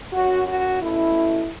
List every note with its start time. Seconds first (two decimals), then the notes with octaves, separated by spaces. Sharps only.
0.13 F#2 F#3 C#4 F#4
0.48 F#4
0.80 B2 A3 C#4 E4